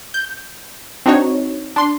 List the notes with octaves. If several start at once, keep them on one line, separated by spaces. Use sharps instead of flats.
G6
C4 D4 D#4 F#4 C#5
D4 C6